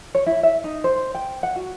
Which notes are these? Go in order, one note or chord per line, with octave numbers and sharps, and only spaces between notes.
C#5
E4
E5
D#4
C5
G5
F#5
F#4